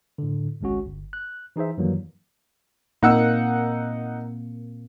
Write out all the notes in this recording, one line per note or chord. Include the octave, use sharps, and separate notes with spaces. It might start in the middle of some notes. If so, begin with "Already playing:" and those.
A2 D3
G#1 C#2 G#3 C#4 F#4
G1
F#6
E3 D#4 G#4 C5 E5
F#2 D#3 E3 F#3 G3 A#3
A#2 A#3 C4 D#4 F#5 E6